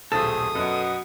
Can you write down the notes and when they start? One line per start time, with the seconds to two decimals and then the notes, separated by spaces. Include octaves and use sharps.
0.12 D#1 B1 A3 C4 G#4 A4 D#6 A6
0.55 F#2 B2